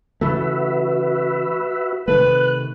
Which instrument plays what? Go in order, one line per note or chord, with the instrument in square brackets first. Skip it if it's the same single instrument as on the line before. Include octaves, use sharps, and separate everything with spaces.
[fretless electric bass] C#3 E3 A3 [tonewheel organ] F#4 B4 E5
[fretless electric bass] C3 D#3 A3 [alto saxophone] B4 [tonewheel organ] F#6